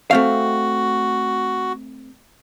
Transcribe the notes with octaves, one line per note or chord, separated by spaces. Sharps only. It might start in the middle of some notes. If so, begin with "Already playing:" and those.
A3 C4 F#4 F5